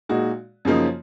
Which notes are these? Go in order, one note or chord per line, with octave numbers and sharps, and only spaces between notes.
A#2 G#3 D#4 F#4
F#2 C#3 F3 A#3 D#4